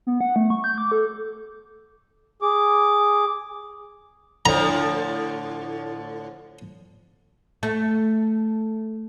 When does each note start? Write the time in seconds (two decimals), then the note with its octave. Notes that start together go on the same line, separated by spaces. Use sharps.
0.07 B3
0.21 F#5
0.36 A3
0.50 C#6
0.64 G6
0.78 D6
0.92 A4
2.42 G#4 D6
4.46 A2 D3 F3 A#5
7.63 A3